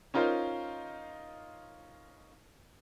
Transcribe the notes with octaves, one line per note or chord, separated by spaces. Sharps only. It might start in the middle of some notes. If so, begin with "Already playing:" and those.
C#4 D#4 F4 A#4 C5